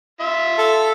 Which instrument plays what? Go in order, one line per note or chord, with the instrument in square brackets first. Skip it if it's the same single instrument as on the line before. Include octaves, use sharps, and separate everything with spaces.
[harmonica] F4 E5
[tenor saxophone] A4